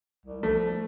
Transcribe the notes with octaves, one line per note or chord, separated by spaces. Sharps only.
C2
F3 A3